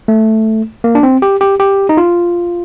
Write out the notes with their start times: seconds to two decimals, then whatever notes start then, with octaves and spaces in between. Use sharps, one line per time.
0.08 A3
0.84 A#3
0.95 D4
1.03 C4
1.22 G4
1.41 G4
1.60 G4
1.89 D#4
1.97 F4